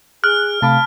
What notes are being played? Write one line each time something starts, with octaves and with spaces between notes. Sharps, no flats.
G#4 F6 F#6
C3 A3 F5 A5 B5 D6